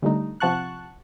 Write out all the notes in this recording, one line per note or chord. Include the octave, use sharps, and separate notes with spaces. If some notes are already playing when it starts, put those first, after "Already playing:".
D3 G3 A3 D#4
C3 F3 F#5 A5 C#6 F#6